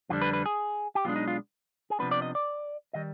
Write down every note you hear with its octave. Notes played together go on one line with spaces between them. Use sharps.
F2 D3 G3 D4 F4
B4
B4
G#4
G4
B1 B2 G#3 D4 F4
D#4
F4
G#4
C3 F3 B3 D4 B4
D5
D#5
D5
D#3 G3 D#5